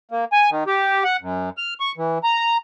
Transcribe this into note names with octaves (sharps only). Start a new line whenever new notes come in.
A#3
G#5
D#3
G4
F#5
F#2
F6
C#6
E3
A#5